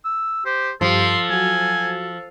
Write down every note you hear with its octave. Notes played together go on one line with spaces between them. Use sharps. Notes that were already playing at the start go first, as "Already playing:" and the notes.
E6
G4 C5
G2 F3 G4 A4 C6
F#3 F#4 G#5